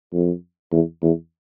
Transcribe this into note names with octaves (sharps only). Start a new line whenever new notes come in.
F2
E2
E2